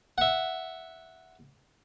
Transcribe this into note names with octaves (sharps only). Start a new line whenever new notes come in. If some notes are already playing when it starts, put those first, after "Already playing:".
E5 F#5